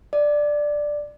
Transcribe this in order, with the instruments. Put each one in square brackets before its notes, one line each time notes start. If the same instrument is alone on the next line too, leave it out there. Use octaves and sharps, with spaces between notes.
[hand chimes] D5